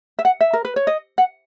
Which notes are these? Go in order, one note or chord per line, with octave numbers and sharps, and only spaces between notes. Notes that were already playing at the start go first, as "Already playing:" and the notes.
E5
F#5
E5
A#4
B4
C#5
D#5
F#5